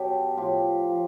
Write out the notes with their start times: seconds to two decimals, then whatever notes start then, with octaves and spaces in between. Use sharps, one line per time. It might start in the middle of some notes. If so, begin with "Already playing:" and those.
Already playing: B2 F#3 G4 A4
0.37 A2 F3 F4 G4
0.89 F3